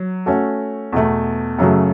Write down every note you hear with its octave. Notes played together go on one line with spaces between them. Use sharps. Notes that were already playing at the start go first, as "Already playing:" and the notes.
Already playing: F#3
A3 C#4 F#4 A4
E2 B2 A3
F#2 C#3 F#3 A3